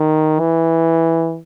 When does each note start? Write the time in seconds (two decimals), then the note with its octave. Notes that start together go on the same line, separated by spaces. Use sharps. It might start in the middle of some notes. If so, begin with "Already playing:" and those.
Already playing: D#3
0.40 E3